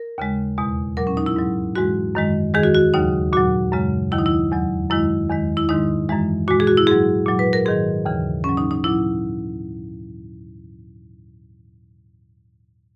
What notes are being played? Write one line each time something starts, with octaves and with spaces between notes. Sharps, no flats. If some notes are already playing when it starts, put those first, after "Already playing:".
Already playing: A#4
D#2 C#3 G#3
E2 B2 G#3
A#2 F#3 A#4
C#4
D#4
E4
G#2 F#3
G#2 E3 G#3 F#4
F#2 D#3 G#3
E2 D#3 G#3 G#4
F#4
F#4
D#2 C#3 F#3 D#4
A#2 F#3 F#4
F#2 C#3 G#3
D#2 D#3 F#3 E4
D#4
E4
E2 C#3 F#3
F#2 D#3 G#3 E4
E2 D#3 G#3
E4
G#2 D#3 G#3 D#4
F#2 E3 G#3
A#2 G#3 F#4
G#4
F#4
E4
G#2 F#3 G#4
A#2 F#3
B4
A#4
G#2 D#3 F#3 G#4
D#2 C#3 E3
G#2 F#3 C#4
D#4
D#4
A#2 F#3 E4